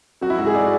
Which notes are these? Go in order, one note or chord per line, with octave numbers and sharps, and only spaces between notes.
F#3 F#4
E4
G#2 F#4
G#4
D5